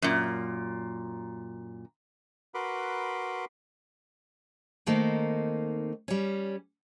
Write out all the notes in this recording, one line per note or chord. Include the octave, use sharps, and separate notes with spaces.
F#2 A#2
F#4 A#4 B4 B5 C6 D6
D#3 A3 A#3 C4 D#4
G3 C#4